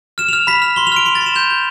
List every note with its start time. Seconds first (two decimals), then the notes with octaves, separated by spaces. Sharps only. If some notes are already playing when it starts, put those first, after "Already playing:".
0.18 F6 E7
0.29 F7
0.33 F6
0.47 B5 B6
0.62 F6
0.76 C6 G7
0.87 F7
0.92 F6 D7
1.06 C6 D7
1.15 A6
1.21 C6
1.26 E7
1.35 G6 F7
1.51 G6